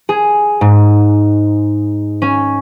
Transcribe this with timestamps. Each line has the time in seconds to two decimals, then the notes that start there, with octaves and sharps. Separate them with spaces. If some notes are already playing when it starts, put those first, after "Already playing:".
0.09 G#4
0.61 G#2
2.22 C#4